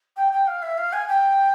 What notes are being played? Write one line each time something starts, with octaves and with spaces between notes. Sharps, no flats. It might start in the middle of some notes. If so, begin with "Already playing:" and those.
G5
G5
F5
E5
F5
G#5
G5